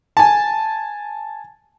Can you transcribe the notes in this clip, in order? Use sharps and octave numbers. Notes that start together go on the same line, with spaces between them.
G#5 A5